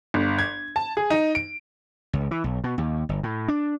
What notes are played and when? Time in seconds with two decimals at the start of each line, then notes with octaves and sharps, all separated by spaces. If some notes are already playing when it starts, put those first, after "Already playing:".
0.14 G1
0.39 G#6
0.76 A5
0.97 G#4
1.10 D#4
1.35 D7
2.13 C#2
2.31 E3
2.44 B1
2.64 B2
2.78 D#2
3.09 G1
3.23 A2
3.48 D4